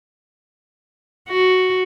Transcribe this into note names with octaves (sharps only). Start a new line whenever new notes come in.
F#4